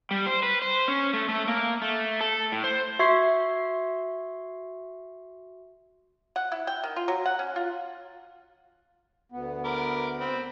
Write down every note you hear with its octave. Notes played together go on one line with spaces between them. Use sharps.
G3
C5
B4
C5
C#4
A3
A3
A#3
A3
A4
A2
C5
F#4 E5 C6 C#6 G#6 C7
F#5
E4
G5
D#3
F4
F#3
F#5
C#4
F4
D2 B3
A#4 B5 D6
C4 B5